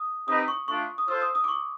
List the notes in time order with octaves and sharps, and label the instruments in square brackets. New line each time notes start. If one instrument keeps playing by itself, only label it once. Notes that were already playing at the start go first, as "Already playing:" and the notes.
Already playing: [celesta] D#6
[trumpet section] C4 D#4 G4 B4 D#5 [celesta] D#6
[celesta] C#6
[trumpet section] A3 D4 F4 [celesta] C#6
[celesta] D#6
[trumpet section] F4 A4 C5 [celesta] E6
[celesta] D#6
D#6
D6
C#6